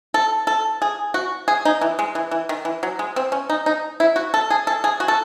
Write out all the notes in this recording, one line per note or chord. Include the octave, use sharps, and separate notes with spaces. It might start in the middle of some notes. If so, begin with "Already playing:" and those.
A4
A4
G#4
F#4
G#4
D#4
E3
G#3
E3
E3
D#3
E3
F#3
G#3
C4
C#4
D#4
D#4
E4
F#4
A4
G#4
A4
G#4
F#4
A4